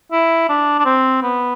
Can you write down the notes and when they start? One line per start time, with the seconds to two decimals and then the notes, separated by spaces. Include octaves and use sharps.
0.12 E4
0.49 D4
0.79 D4
0.86 C4
1.23 B3